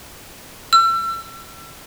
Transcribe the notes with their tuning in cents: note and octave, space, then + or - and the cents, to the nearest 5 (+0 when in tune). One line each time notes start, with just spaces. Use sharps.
E6 +40